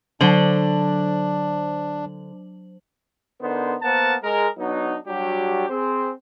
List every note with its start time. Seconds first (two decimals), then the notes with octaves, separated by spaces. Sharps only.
0.21 D3 F#3 D4 C5 F#7
3.41 D3 B3 D#4 A#4 C5
3.81 A#3 B3 A#4 C5 F#5 A5
4.21 G#3 G#4 A#4
4.58 F#3 B3 D4 D#4
5.06 F#3 G3 D4 F#4 G4
5.69 C4 G#4 C5